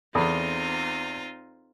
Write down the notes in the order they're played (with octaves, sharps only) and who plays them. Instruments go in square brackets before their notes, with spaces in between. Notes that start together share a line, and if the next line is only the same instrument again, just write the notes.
[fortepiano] E2 [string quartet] C4 D#4 F4 [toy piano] A4 B5